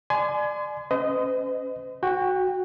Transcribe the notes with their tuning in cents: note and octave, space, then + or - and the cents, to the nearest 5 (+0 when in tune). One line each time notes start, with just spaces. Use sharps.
D5 +25 G#5 +25 C6 -35
C#4 +0 C5 -45 D#5 +0
F#4 +0 G5 +25